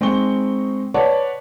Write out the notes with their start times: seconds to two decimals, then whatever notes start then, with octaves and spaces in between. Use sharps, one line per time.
0.01 G#3 C4 D#4 C#6 G7
0.94 B4 C#5 D5 F#5 A5